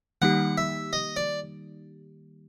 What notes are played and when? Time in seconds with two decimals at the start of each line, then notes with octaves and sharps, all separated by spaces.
0.22 D#3 G3 A#3 D#4 G4 F#5
0.58 E5
0.93 D#5
1.16 D5